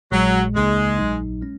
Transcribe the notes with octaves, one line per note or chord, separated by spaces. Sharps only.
A#1 A#2 F#3 G#3
C#2 C#3 G#3 A#3 D#4
A#1 A#2 F#3 D#4
G#3 C#4